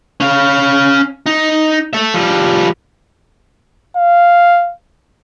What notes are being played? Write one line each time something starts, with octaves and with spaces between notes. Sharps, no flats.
C#4 F5
D#4
A4 E5
F3 G3
F5